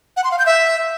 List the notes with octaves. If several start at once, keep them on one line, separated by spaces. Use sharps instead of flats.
F#5
C6
F5
G6
E5